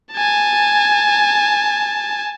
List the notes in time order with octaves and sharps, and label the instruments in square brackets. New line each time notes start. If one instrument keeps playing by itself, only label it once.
[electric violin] G#5 A5